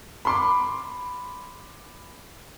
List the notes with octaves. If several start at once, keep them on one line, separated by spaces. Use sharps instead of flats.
B5 C6 D6